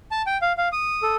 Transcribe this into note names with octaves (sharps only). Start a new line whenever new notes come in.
A5
G5
F5
F5
D#6
A4